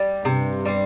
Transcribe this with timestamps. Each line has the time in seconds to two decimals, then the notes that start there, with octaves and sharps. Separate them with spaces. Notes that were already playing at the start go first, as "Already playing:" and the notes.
Already playing: G3
0.25 G2 C3
0.65 G3 C4